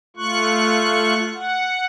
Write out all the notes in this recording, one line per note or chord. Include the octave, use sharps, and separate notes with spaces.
A3 F4 C#6 F#6
F#5